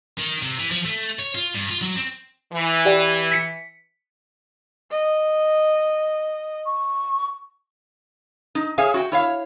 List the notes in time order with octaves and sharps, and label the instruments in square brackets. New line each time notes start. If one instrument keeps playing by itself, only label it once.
[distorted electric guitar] D#3
C3
E3
F3
A3
C#5
F4
G2
F4
F#3
C4
[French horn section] E3
[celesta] G4 D5 G5
B6 C#7
[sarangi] D#5
[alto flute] C#6
[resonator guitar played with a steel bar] D#4
G#4 C#5 E5 F5 G#5
F#4 G5
E4 C#5 F5